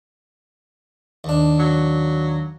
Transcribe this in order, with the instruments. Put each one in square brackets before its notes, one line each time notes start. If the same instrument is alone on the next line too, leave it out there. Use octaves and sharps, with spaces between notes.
[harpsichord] D#2 D4
[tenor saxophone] F#3